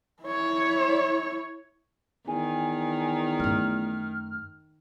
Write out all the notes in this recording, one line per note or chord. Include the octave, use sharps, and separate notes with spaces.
E4 C#5
E2 D#3 G#5
F#2 A3 F6